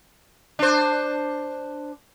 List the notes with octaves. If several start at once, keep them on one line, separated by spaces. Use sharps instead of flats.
D4 C5